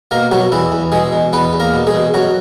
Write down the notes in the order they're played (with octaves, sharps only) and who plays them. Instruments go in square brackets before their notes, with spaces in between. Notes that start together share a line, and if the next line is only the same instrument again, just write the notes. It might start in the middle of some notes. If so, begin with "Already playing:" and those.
[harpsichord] B2 A#3 A#4
B2 F#3 F#4
E2 E3 E4
E2
B2 G#3 G#4
B2
E2 B3 B4
E2
A#3 A#4
B2
G#3 G#4
B2
F#2 F#3 F#4